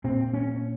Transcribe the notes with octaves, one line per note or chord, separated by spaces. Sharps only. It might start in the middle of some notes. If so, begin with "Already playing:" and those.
A#2 C4
C#4